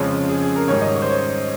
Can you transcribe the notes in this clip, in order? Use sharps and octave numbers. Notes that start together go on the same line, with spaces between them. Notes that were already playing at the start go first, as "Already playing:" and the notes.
Already playing: F2 C#3 F3 G#3 C#4 C5
G#4
G#4
A#4
G#2 D#3 G3 C#4 C#5
D#5
C#5
C5
C#5